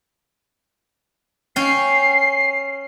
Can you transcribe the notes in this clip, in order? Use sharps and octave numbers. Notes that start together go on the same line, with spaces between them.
C#4 G5 C7